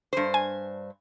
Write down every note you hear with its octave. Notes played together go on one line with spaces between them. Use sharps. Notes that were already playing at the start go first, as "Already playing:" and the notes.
G2 C5
G#5